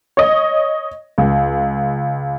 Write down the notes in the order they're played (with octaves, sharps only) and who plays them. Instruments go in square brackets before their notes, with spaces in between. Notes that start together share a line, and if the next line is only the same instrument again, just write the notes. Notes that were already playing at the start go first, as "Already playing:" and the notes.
[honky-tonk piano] C#5 D#5
C#2